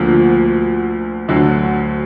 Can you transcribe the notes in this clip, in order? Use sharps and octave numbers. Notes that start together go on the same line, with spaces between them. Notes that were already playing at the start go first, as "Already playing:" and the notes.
Already playing: D2 D3 F3 A#3
D2 D3 F#3